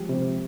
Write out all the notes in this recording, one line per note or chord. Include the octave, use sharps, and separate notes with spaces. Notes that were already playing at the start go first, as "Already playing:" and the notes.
Already playing: F3 G#3 G4
C3